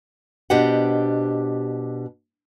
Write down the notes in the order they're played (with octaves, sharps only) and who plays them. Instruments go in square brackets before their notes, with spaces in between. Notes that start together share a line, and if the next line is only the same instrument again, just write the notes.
[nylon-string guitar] B2 D4 G4 C5 D#5 F#5